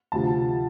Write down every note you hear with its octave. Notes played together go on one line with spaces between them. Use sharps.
D2 C3 F3 A5